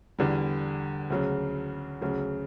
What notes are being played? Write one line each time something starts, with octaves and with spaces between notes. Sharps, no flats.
E2 D3 G3
D2 C#3 F#3
D2 C#3 F#3